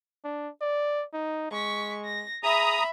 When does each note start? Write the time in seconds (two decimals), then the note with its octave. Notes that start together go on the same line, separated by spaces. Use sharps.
0.25 D4
0.62 D5
1.14 D#4
1.51 G#3 C#6 B6
2.04 A#6
2.43 G#4 E5 A#5 B5 D#6